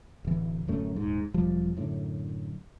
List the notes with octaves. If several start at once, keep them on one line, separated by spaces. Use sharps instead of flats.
D1 E3
D1 F#2 A3 C#4
D#1 G#2
E1 F3 G3
F#2 A2 D3